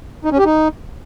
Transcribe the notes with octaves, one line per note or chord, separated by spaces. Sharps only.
D#4
C#4
G4
D#4